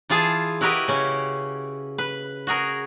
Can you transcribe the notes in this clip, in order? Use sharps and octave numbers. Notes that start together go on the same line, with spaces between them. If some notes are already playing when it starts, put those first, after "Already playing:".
E3 F4 G#4 A5
E4 F#4 G4 A#4 B4 D#5
C#3 C#4
B4
F#4 G#4 A#4